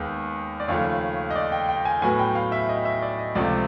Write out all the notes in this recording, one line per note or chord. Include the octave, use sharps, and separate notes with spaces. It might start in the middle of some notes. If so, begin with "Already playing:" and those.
Already playing: D#2 D#3 G#3 B3
D5
D#2 C#3 F3 A3 C#5
D#5
D5
G5
G5
G#5
A2 F#3 B3 G#5
G5
F5
E5
D#5
E5
D5
D#5
C#2 C3 F3 A3 D5